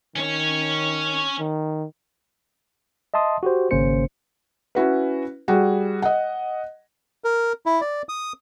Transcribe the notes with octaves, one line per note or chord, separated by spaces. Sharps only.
D#3 C#4 C#5
D#3
D#5 E5 A5 C6 D#6
F#4 G4 C5
G#1 C#3 A#3 C#4 C5 C#7
C#4 E4 F#4 B4
G3 F#4 G#4
D#5 F#5
A#4
E4
D5
D#6